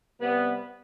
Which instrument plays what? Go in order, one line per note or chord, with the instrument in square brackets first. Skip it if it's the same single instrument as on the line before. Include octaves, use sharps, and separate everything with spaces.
[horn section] C3 G3 B3